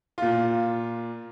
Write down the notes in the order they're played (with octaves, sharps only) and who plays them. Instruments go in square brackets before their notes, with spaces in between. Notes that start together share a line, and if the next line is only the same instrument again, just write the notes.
[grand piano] A#2 F4